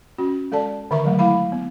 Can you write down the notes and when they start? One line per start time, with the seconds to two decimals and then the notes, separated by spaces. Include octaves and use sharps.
0.18 C#4 F#4
0.52 G#3 A4 D5 A5
0.91 D3 D#3 A#4 E5 A#5 C#6
1.04 F3 F#3 G#3 A3
1.19 A3 E4 F5 B5
1.52 B3